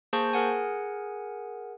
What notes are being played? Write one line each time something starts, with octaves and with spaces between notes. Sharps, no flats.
A#3 G#4 C5 A5 C#6 G6
G#4 A#4 F#5 G#5